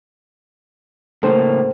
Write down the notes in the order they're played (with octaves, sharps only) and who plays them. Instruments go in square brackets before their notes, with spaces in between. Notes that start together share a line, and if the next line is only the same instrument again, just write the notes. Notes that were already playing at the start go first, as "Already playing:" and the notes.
[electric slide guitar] A2 C#3 A#3 [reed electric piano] A4 C5